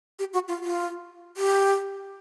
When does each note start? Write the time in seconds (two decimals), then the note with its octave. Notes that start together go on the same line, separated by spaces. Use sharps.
0.19 G4
0.33 F#4
0.48 F4
0.64 F4
1.37 G4